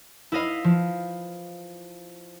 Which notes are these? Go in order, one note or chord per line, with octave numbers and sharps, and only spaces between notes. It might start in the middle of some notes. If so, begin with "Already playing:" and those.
E4 B4 D#5 F5
F3